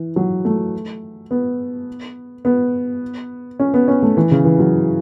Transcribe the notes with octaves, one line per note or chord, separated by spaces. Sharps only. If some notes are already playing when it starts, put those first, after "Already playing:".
Already playing: E3
F#3
A3
B3
B3
C#4
B3
C#4
A3
E3
C#3
E3
F#3